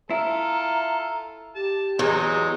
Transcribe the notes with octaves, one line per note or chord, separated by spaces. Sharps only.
E4 F4 A4 A#5
G4 A5
E2 F#3 G#3 D#4